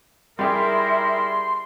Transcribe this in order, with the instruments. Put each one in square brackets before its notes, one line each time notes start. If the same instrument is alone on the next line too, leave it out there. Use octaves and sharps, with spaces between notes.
[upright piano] G3 G4 G#4 [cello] E4 [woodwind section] A#4 [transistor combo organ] C6